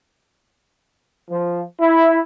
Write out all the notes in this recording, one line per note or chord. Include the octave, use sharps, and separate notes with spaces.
F3
E4